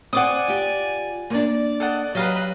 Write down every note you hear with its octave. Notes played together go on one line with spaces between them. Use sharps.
C4 C5 D5 F#5 G#5 D6 D#6
F4 G4
A#3 D4 D5
A4 D#5 F#5
F#3 G4 B4 D#5 F5 A#5